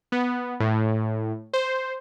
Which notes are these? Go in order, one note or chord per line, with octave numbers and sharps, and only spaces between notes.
B3
A2
C5